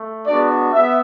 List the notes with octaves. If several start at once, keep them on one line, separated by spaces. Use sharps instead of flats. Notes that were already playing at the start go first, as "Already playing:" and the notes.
Already playing: A3
G#3 B3 D4 F#4 D5
B3 E5